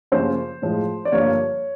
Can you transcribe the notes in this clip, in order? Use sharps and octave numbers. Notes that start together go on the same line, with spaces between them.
F#2 C#3 F3 A#3 C5
A2 F3 G#3
D5
G2 D3 F3 A#3 C#5